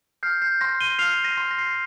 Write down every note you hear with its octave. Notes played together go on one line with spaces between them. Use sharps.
F6 G6 C7
G6 C7
C6 A#6
D#7 G7
F6 C7 F7
A#6 D#7
C6
A#6
C7
A#6